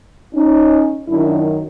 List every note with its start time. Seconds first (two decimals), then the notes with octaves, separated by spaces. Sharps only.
0.35 C#4 D#4
1.08 F#2 D#3 F#3 D4 E4